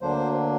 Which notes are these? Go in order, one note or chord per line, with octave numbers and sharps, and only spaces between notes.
D2 D3 F#3 A#3 D4 C5